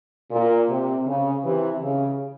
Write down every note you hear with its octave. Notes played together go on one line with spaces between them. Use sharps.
A#2
C3
C#3
C3 E3
C#3